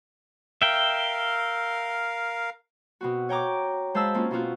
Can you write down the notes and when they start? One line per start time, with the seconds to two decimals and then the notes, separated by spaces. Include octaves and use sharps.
0.62 A#4 E5 F5 G5
3.01 B2 C4 F#4
3.29 C#5 G5 A#5 D6
3.94 G#3 C5 F5 A5 B5 E6
4.14 A#3 C4 C#4 F4
4.31 B2 C4 F4 F#4